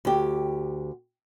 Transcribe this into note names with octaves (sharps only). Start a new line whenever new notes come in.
D2 G4